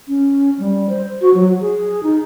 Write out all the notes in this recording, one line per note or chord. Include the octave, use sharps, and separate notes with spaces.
C#4
G3
C5
F#4
F#3
G#4
D#4